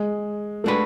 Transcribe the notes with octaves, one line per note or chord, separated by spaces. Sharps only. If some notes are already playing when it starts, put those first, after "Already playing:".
Already playing: G#3
G#3 A3 D4 F#4 B4